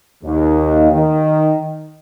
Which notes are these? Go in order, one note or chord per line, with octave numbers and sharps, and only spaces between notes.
D#2
D#3